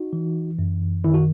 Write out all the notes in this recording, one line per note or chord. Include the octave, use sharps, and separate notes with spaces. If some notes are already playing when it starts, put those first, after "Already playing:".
Already playing: D#4 F#4
E3
F#2
D#3 E4
F#4